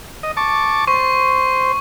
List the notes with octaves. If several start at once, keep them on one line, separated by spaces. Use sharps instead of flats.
D#5
A5 C#6 D6
C5 C#6